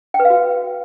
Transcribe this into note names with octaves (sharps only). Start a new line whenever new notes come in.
G5
B4
F5
F#4